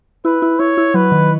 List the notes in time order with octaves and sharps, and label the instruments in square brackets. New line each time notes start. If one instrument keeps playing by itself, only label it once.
[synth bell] E4 [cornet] B4
[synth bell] E4
[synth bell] E4 [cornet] C#5
[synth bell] E4
[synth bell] F#3 [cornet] B4
[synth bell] D#3